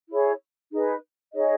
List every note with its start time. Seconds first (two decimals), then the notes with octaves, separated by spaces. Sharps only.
0.09 E4 G#4 C#5
0.72 D#4 G#4 B4
1.34 D#4 G#4 C#5 D#5